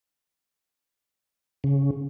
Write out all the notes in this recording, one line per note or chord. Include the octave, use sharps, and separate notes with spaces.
C#3